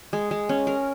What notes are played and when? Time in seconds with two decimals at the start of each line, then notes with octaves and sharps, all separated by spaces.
0.13 G#3
0.31 G#3
0.49 C#4
0.67 A#4